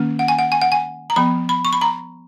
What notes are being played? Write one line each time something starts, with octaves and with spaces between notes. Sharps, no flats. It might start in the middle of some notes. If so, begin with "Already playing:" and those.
Already playing: D#3 A#3 C#4
F#5
G#5
F#5
G#5
F#5
G#5
A#5
F3 B3 B5
B5
C#6
B5
A#5